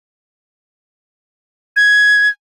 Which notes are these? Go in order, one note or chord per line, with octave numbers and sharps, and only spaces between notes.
G#6